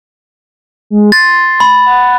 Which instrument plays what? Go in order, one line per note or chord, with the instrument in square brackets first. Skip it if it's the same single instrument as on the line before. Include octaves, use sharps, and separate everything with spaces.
[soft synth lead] G#3
[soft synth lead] C6 [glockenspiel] A6
[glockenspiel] B5
[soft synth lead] F#5